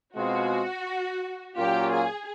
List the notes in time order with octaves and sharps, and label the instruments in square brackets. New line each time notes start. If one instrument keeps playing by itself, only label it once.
[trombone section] B2 G#3 C4 F4 G#4 [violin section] F#4
[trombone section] A#2 F#3 A#3 C#4 F4 [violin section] G4
[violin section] G#4